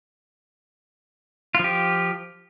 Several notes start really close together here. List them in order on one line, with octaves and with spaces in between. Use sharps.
F4 F3 G4